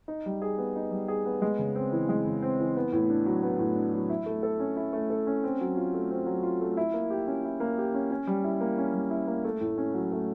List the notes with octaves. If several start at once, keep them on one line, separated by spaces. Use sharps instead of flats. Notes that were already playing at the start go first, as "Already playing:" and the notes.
D#4
G3
G#4
B3
D#4
G3
G#4
B3
G#3
C#3
C4
E3
G#3
C#3
C4
E3
B3
A2
D4
F#3
B3
A2
D4
F#3
E4
A3
A4
C#4
E4
A3
A4
C#4
C4
F#3
F4
A3
C4
F#3
F4
A3
E4
A#3
G4
C#4
E4
A#3
G4
C#4
C#4
G3
E4
A#3
C#4
G3
E4
A#3
A3
A2
C#4
F#3
A3